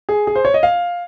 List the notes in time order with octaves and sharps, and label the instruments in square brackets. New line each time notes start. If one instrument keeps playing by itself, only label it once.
[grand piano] G#4
G#4
C5
C#5
D#5
F5